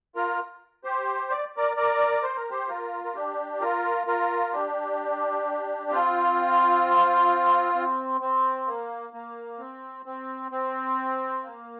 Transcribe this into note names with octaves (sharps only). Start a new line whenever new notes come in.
F4 A#4
G4 C5
D5
A#4 D5
A#4 D5
C5
A#4
G4 C5
F4 A#4
A#4
D4 G4
F4 A#4
F4 A#4
D4 G4
C4 F4
C4
C4
A#3
A#3
C4
C4
C4
A#3